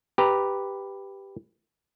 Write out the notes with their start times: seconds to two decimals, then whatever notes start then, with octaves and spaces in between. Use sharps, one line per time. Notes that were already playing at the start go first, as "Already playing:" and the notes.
0.18 G4 B4 A#5